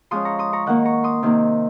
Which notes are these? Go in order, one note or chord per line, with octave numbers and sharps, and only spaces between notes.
F3 G#3 C#4 C6 D#6
A#5 C#6
C6 D#6
A#5 C#6
D#3 A#3 D#4 F#5 A#5
A#5 C#6
C6 D#6
C3 D#3 A#3